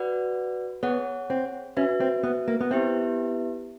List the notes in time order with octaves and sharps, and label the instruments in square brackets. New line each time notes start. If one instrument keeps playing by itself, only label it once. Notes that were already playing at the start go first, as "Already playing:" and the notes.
Already playing: [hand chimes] F#4 B4 D5 F#5
[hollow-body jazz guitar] B3 [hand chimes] G#4 C#5 F#5
[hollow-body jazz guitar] C4
[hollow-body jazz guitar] C#4 [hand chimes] F#4 B4 E5
[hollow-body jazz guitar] C4
B3
A#3
B3
[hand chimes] B3 E4 G4 B4 E5 [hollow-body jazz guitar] C4